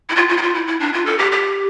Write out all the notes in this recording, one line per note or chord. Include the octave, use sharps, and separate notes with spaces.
E4
F4
F4
E4
F4
E4
E4
D4
F4
A4
G4
G4